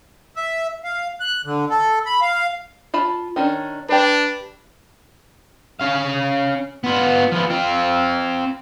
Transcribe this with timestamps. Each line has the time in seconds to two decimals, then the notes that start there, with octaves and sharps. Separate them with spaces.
0.36 E5
0.84 F5
1.20 F#6
1.45 D3
1.70 A4
2.06 B5
2.22 F5
2.94 F4 A5 B5
3.36 D#3 C#4 D4
3.89 D4 G4 B4
5.81 C#4 F5
6.84 B3 F4
7.32 F3 B3
7.50 C4 F4